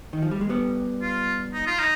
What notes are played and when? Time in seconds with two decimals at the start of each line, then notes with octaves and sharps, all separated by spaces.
0.13 D#3
0.22 F3
0.31 G3
0.41 G#3
0.49 G3 B3
1.02 F4
1.54 D#4
1.67 F4
1.80 D#4